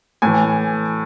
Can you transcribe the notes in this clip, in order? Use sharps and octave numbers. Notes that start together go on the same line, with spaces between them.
A2 E3 G#5